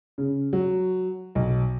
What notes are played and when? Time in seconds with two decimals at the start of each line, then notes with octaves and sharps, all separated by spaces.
0.18 C#3
0.53 F#3
1.35 B1